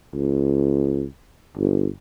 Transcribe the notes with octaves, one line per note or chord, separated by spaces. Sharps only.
C#2
G1